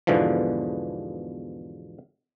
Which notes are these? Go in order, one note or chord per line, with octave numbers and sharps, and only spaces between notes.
E2 G#2 B2 D3 E3 F3